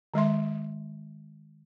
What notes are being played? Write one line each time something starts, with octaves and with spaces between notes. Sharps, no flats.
D#3 G#3 E5 C6